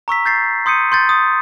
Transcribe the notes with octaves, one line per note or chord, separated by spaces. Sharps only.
A#5 C#6 E6 B6
G6 A6 C7
C6 D#6 G6 C#7 D#7
C6 G6 A6
D#6